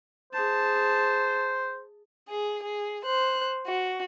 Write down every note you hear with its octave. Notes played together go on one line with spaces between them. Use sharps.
G#4 C5 A5
G#4
G#4
C5 F#6
F#4